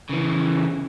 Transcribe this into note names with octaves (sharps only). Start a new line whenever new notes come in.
C#3 E3